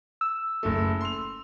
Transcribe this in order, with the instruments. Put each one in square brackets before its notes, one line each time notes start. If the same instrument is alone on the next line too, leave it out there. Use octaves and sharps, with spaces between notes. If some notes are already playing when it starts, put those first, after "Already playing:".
[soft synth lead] E6
[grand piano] F#1 A3
C6 F7